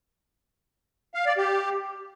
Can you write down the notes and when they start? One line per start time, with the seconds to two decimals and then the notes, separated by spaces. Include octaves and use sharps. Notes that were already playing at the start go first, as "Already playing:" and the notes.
1.14 F5
1.26 D5
1.37 G4